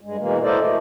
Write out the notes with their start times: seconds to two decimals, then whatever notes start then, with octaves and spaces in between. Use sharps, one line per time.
0.01 G2 G#3
0.19 B2 E3 G#3 A#3
0.43 E4 A4 A#4 C5 D5 D#5
0.59 A3